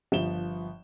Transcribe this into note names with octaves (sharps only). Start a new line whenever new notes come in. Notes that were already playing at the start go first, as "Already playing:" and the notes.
G1 F3 E7 G7